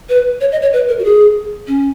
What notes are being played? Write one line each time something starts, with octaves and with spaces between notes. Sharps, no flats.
B4
C#5
D#5
C#5
B4
A#4
F#4
G#4
C#4